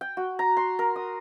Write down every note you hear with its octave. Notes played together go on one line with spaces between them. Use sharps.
G5
F#4
A#5
C6
A#4
D#6